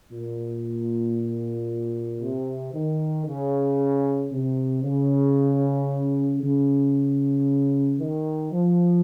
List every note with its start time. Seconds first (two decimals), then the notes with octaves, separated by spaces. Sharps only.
0.11 A#2
2.20 C3
2.73 D#3
3.26 C#3
4.31 C3
4.83 C#3
6.41 C#3
7.99 D#3
8.51 F3